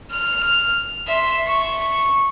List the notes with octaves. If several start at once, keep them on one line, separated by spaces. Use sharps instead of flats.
F6
E5 C6
C#6